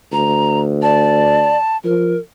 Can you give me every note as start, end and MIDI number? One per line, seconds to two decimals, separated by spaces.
0.12 1.56 38
0.12 0.61 82
0.83 1.57 74
0.83 1.77 81
1.84 2.14 53
1.84 2.18 70